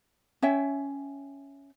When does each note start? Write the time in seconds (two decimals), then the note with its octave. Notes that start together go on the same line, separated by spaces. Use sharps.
0.42 C#4 C#5 E5 G5